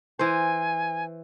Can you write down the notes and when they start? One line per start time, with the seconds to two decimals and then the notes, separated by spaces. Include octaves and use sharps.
0.19 E3 C5 G#5